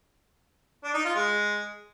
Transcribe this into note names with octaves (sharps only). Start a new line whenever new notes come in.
D4
D#4
F4
G#3